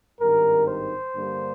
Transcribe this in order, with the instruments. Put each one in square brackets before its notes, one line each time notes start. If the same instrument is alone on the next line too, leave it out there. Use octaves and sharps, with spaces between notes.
[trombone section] G#1 G2 D#3 A#4
C5
G2 D3 G3 A#3